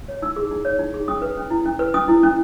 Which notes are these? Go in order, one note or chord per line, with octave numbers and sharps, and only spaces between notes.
C#5
D#4 E6
G#4
D#4
C#5
D#4
G#4
C#4 D#6
B4
C#4
E4
C#4
B4
C#4 D#6
E4
C#4